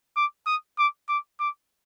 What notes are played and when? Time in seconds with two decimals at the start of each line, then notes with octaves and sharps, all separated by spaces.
0.16 D6
0.47 D#6
0.78 D6
1.09 D6
1.40 D6